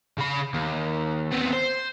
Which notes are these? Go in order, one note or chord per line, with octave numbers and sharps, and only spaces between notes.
C#3 B5
D#2
B3 C4
C5